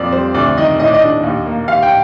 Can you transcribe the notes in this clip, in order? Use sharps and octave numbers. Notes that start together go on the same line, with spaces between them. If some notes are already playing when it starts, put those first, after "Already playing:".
Already playing: F2 A#3 D5
G3 C5
D2 D5
D#3 D#5
A2 D#5
D5
D#5
D4
D#2
A#3
D#2 F5
G5